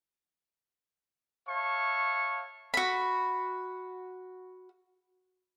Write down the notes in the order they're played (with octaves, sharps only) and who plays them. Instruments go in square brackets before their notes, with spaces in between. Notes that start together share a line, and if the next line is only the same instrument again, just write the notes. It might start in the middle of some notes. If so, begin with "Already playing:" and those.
[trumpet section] C#5 E5 F5 A5 C#6
[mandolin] F#4 B5